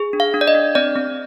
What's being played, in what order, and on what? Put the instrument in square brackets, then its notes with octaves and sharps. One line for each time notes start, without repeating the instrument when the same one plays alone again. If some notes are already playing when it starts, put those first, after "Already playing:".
Already playing: [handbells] G#4
D4
F5
D4
D5
D#5
D4
C4 D5
C4